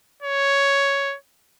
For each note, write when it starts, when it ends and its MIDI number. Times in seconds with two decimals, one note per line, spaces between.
0.23 1.16 73